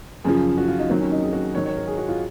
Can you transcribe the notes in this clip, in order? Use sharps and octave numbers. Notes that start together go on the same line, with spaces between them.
F#2 C#3 F3 G#4
F#4
F4
D#4
D#2 D#3 F#3 C4
C#4
D#4
G#4
F#4
G#2 D#3 F#3 C#5
C#5
A#4
G#4
F#4
F4